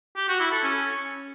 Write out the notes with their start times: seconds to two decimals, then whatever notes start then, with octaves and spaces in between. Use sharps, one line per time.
0.17 G4
0.28 F#4
0.40 E4
0.52 A4
0.64 C#4